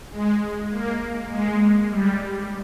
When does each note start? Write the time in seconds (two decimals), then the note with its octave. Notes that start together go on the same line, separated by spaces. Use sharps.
0.11 G#3
0.71 A#3
1.30 G#3
1.90 G3